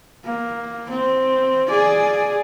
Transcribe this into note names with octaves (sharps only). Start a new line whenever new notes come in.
A#3
C4
G#4 D5